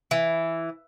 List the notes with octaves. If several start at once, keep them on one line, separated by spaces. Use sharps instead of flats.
E3